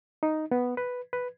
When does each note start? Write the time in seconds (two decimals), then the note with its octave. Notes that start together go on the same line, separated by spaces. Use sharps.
0.23 D#4
0.51 B3
0.77 B4
1.13 B4